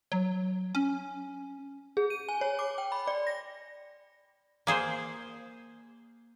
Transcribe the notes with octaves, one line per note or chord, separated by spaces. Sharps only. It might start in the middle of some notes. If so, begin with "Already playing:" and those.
F#3
C#4
G#4
D#7
G#5
C#5
D6
G5
B5
D5
A#6
A#3 G#4 C5